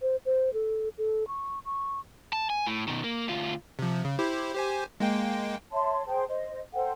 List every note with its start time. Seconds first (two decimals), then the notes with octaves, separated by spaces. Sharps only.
0.01 C5
0.25 C5
0.53 A4
0.98 A4
1.28 C#6
1.65 C#6
2.33 A5
2.50 G#5
2.66 A2
2.88 B2 D#3
3.04 A#3
3.28 D2 F4
3.79 C3 F3
4.04 C#3
4.19 E4 G4 C5
4.54 G4 C5 G#5
5.00 G#3 A#3 G5
5.72 C#5 E5 A5 C6
6.06 G#4 C5 G5 A5
6.28 C5 D#5
6.73 A4 C5 F#5 G5